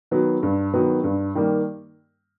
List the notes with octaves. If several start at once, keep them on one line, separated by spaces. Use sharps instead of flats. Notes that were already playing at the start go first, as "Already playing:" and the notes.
D#3 F#3 B3
G2
D#3 F#3 B3
G2
D#3 G3 A#3